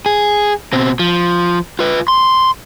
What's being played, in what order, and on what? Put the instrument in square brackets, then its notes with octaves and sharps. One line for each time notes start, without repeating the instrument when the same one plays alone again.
[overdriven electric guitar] G#4
B2 C4
F3
F4 B4
C6